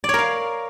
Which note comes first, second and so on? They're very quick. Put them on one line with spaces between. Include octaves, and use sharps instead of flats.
D5 C#5 A#4 F5